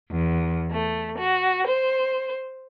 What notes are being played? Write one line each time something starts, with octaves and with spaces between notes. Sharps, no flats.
E2
A3
F#4
C5